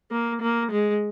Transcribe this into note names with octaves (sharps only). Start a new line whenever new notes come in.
A#3
A#3
G#3